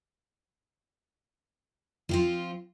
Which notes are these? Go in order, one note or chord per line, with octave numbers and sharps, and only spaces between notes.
F3 C4 F4